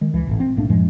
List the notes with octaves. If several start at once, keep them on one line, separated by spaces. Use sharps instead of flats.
D#3 G#3
C#2 E3
G#1 A2
C4
A#1 A2 A#3 D4
F#2 A2 F3 G#3